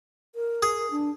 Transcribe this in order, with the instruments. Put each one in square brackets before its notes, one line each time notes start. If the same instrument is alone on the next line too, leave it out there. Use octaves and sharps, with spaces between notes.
[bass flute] A#4
[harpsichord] G#4
[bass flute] D4